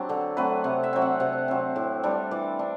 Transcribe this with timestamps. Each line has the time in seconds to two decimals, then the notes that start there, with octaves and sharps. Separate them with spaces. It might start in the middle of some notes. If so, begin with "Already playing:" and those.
Already playing: F#3 C4 D4 G4
0.09 D3 A4
0.37 F#3 A3 C4 B4
0.64 C3 F#5
0.83 E5
0.93 F#3 C4
1.02 F#5
1.20 C3 F#5
1.48 F#3 C4
1.76 A2
2.03 G3 D4
2.31 E3 D5
2.59 D4